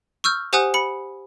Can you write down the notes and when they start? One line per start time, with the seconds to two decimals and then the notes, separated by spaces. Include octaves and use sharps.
0.24 C#6 E6 F6 G6
0.53 G4 C5 F#5 G#5 D#6 F#6
0.74 B5 C#7